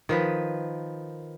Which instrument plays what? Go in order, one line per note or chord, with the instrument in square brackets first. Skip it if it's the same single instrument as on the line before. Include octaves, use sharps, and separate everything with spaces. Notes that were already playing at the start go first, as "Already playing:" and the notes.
[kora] D#3 F3 B4